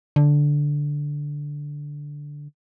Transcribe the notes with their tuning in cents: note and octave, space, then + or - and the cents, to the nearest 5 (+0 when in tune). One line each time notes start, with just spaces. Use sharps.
D3 -5